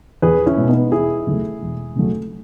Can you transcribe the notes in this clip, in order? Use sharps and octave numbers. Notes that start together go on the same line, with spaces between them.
E2 G#4 B4
C#4 E4
B2 G#3
B3 D#4
E1 E4 G#4
D#2 C#3 F#3 A3
E1
D#2 C#3 F#3 A3